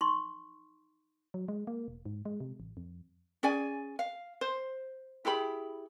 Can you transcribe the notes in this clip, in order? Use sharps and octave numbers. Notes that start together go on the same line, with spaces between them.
D#4 C6 C#6
F#3
G#3
A#3
E1
G#2
G#3
C3
A1
F2
C#4 G#4 D5 G#5
F5
C5
E4 G4 G#4 B5